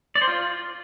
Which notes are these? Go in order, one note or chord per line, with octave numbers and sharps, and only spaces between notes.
D5
C5
F4